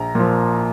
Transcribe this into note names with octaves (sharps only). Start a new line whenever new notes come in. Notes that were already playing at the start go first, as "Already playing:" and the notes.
Already playing: A#1 A#5
A#2 F3